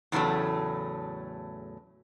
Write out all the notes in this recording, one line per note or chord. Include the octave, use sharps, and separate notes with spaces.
E2 A2 C#3 F#3 A3